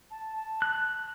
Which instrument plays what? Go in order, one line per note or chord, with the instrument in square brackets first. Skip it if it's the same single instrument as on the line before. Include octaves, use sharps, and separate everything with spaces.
[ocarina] A5
A5
[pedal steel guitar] F#6